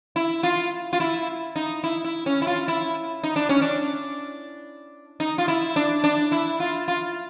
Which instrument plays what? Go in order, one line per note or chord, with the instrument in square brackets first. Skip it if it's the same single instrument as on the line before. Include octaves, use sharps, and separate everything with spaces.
[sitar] E4
F4
F4
E4
D#4
E4
E4
C#4
E4
F4
E4
D#4
D4
C#4
D4
D#4
F4
E4
D4
D4
E4
F4
F4